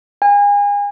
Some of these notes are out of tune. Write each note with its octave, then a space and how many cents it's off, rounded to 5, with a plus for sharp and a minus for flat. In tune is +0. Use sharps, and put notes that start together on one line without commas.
G#5 -35